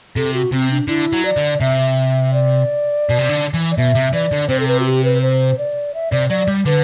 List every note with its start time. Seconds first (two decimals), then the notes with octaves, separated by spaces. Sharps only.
0.16 C3 A4
0.34 F#4
0.52 C3 C4
0.71 D4
0.88 D3 E4
1.13 F#3
1.25 D5
1.37 D3
1.61 C3 E5
2.33 D5
3.10 B2
3.19 C3
3.29 D3
3.54 E3
3.71 D5
3.77 B2 E5
3.95 C3
4.13 E3 D5
4.32 D3
4.49 C3 C5
4.60 A4
4.68 B4
4.80 F#4
4.85 G4
5.04 B4
5.22 C5
5.58 D5
5.94 E5
6.12 C3 D5
6.30 F#3 D5
6.48 G3
6.66 D3 B4